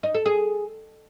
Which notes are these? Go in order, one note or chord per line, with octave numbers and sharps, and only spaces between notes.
D#4
A4
G#4